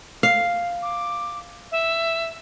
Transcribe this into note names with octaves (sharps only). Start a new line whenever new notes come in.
F5
D6
E5